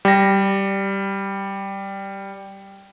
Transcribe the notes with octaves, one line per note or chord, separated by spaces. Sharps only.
G3 A#6